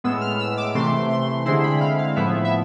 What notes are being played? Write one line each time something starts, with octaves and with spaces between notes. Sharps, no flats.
A2 G#3 B3 E6
F6
E6
D6
C3 E3 A3 C6
C6
D3 G#3 C4 E4 C6
B5
F5
F5
A2 F3 B3 E4 E5
E5